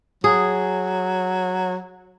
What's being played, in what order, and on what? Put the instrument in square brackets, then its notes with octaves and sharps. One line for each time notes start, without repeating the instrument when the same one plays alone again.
[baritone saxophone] F#3 [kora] G#4